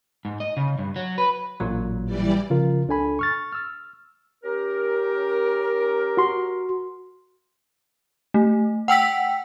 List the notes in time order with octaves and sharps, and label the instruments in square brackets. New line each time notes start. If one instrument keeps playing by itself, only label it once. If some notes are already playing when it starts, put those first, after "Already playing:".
[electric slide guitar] G#2
D#5
C#3
G2
F#3
B4
[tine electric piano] A1 A#2 F#3
[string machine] E3 G3 D5
[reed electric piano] C#3 F3 F4 A#4
C#2 D4 A4 G#5 B5
C#6 F6 A6
E6 F6
[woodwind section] C#4 G4 A#4
[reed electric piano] F#4 C6
[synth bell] A3
F#5 G5 E6 B6